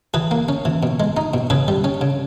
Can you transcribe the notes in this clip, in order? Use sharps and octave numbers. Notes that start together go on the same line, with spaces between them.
E3 G#4 B4
A#3
C#4
E3
B2
G#3
D#4
B2
C#3 G#4 B4
G3
C#4
C#3